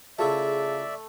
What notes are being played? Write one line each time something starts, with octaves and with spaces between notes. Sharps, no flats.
C#3 A3 E4 F4 G#4 D5 E5